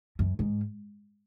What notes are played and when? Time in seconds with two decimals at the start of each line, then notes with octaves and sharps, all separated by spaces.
0.19 F#2
0.39 G#2